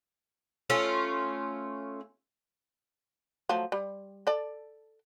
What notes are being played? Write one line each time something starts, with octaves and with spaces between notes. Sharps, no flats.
A3 C#4 F4
F3 F#3 A3
G3
A4 D5